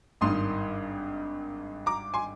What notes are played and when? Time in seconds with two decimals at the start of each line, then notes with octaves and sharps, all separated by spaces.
0.21 G#1 G2 D#3 C6 D#6
1.86 A#5 D6
2.14 G#5 C6